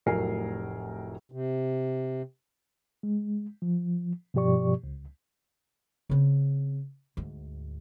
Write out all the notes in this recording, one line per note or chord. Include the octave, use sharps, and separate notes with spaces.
F1 A2 F#3 A#4 G#5 C7
C3
G#3
F3
G2 B2 F3 G4 D5 C#6
C#2
C#3 C4
D2 G#2